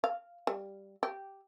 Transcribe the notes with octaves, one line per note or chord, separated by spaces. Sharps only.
F5
G3
G4